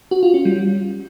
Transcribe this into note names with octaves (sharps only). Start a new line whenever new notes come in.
F#4
F4
C#4
G3